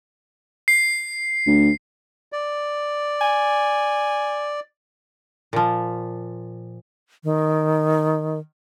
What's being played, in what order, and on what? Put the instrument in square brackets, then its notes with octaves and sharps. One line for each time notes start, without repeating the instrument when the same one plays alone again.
[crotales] C7
[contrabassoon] D2
[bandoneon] D5
[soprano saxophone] G#5
[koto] A#2 F3
[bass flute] D#3